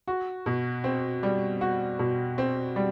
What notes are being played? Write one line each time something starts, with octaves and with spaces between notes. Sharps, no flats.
F#4
B2
C4
G3
F#4
B2
C4
G3